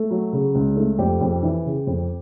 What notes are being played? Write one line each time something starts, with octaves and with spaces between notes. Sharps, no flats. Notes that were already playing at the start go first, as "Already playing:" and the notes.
Already playing: A3
F#3
C#3
C#2
A3
F2 G4
F2
E3
C#3
F2